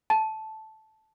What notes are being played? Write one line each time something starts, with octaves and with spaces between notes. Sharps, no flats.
A5